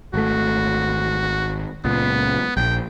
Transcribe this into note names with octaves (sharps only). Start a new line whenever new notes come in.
G#1 A3 F#4
C#2 A#2 B3
A#1 G5